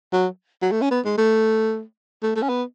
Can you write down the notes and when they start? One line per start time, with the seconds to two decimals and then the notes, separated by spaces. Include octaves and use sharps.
0.13 F#3
0.62 F#3
0.72 A3
0.81 C#4
0.91 B3
1.05 G#3
1.18 A3
2.23 A3
2.36 A3
2.42 C#4
2.49 B3